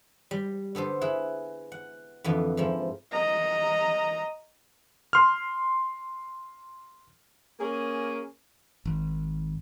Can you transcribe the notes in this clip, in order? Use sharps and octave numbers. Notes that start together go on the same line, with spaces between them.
G3
D3 B3 A4 C5
E4 G#4 F#5
F#5
F2 D3 E3 B3
G#2 F3 E4
D#5 A#5
C6 F6
A#3 C#4 G#4
G#1